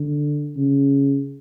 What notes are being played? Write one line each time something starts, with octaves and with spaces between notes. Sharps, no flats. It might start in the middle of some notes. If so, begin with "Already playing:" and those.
Already playing: D3
C#3